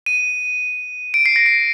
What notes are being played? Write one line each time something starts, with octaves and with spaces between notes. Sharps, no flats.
D#7
D7
C7
A#6
C7